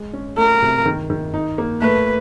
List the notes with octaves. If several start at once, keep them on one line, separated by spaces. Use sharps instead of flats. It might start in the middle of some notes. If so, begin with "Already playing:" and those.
Already playing: G#3
C#4
A3 A#4
C3
D#3
D#3
D#4
A#3
A3 B4